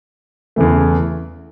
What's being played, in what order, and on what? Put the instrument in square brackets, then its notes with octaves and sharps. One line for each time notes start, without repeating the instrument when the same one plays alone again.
[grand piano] E2 C#3 E3 A3